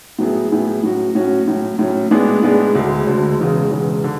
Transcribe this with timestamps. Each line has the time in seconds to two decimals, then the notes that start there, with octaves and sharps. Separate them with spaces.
0.19 A2 F#3 B3 E4 G#4
0.51 A2 F#3 B3 E4 G#4
0.83 A2 F#3 C#4 F#4
1.15 A2 F#3 C#4 F#4
1.48 A2 F#3 C#4
1.79 A2 F#3 C#4
2.11 A2 G#3 B3 D4 G#4
2.43 A2 G#3 B3 D4 G#4
2.75 D2 D3 G#3
3.07 D2 D3 G#3
3.39 E1 E2 C#3 G#3
3.71 E1 E2 C#3 G#3
4.04 D3